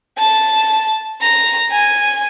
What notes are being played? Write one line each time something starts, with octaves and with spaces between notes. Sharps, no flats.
A5
A#5
G#5